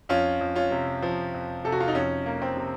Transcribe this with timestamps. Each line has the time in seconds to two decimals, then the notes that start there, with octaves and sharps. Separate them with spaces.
0.09 F2 C#4 F4
0.40 F2
0.56 C#4 F4
0.71 C3
1.02 F3
1.34 F2
1.64 C3 A4
1.72 F#4
1.80 F4
1.88 D#4
1.95 F2 C#4
2.26 A#3
2.42 C4
2.57 C3